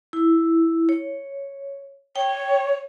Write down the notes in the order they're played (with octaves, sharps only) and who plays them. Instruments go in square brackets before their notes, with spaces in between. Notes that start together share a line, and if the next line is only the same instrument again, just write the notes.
[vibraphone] E4
C#5
[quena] C#5 [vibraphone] G5